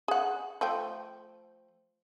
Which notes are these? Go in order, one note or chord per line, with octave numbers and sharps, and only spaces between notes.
G#4 F#5
F3 A3 G5